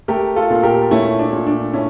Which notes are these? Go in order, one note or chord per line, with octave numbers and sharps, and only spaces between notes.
A3 G4 A#4
F4 A4
A#2
G4 A#4
A3 C#4 E4
D4
A#2
D4
A3 C#4 E4